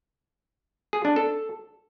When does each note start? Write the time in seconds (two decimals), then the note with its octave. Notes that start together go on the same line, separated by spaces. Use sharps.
0.93 G#4
1.05 D4
1.16 A4